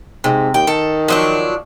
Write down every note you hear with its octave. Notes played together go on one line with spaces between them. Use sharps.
G#2 C3
D#2 G5
D#3 A4
F3 F#3 D4